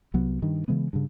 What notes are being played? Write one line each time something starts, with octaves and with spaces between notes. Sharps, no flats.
C2 F#3 B3
G2 D#3
C#3 E3 G#3 B3
G2 C#3